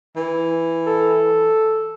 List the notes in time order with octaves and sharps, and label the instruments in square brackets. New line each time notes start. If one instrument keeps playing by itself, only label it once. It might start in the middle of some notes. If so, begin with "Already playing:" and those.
[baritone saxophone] E3
[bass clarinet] A4